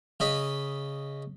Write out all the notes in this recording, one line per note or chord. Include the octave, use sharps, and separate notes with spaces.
C#3 D#5 B5